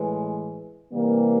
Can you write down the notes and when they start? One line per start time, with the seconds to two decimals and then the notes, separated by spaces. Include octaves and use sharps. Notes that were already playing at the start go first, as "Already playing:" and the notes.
Already playing: A2 E3 G#3
0.93 C3 E3 G3 A#3